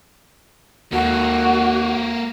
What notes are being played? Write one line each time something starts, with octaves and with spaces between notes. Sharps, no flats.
D#2 A#3 F#4 A4